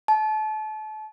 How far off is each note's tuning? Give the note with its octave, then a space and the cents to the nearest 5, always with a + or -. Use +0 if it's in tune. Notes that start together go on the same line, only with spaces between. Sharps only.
A5 -30